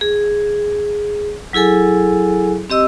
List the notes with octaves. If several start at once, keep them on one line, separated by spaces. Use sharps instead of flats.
G#4
F#3 E4 G#4 A4 G#5
C4 G4 D#5 E6